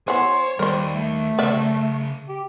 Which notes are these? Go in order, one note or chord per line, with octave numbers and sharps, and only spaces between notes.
E3 B3 C5 C#5
D#2 G3 A#4 C5
A3
C#3 A#4 D5 E5 A5
G4